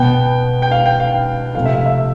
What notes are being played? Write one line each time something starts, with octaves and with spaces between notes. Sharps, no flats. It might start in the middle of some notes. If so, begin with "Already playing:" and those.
Already playing: B2 B3 G5
G5
F5
G5
F5
C3 F3 A3 F5
E5
F5
E5